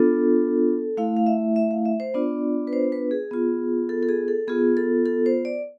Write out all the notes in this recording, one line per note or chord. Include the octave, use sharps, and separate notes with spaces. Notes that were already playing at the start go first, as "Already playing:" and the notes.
Already playing: B3 D4 F4 A4
A3 E4 F5
F5
E5
E5
F5
E5
C5
B3 D4 F4 D5
B4
C5
B4
G#4
B3 F4
A4
A4
G#4
A4
B3 F4 G#4
A4
A4
C5
D5